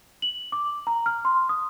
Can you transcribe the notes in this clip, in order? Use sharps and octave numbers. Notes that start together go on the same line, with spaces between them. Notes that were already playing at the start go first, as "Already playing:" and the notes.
F#7
D6
A#5
F6
C6
D#6